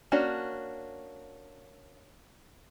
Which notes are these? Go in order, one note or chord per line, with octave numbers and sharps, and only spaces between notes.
A#3 C#4 D4 F#4